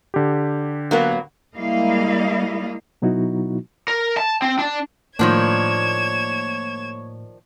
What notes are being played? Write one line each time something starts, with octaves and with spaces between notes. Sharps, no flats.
D3 G4
F#3 A#3 B3
G3 G#3 A#3 E4 D#5 F5
B2 F#3 B3 D#4 E4 F#4
A#4
A5
C4
D4
A2 D#3 F3 A#3 D4 C#5 G#6 E7